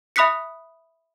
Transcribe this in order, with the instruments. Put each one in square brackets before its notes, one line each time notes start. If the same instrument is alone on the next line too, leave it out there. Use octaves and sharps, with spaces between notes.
[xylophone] E5 B5 D#6 F#6 B6 C#7